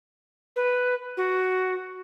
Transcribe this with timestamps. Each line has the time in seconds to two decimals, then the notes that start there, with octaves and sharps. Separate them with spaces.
0.56 B4
1.17 F#4